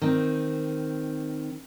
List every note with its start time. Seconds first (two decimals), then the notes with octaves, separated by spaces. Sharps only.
0.02 D#3 C4